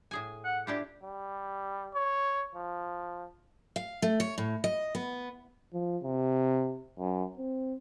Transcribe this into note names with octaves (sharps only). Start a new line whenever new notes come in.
A2 G#4 G#5
F#5
D4 E4 F4 G4
G3
C#5
F3
F5
A3
C#5
A2
D#5
B3
F3
C3
F#2
C4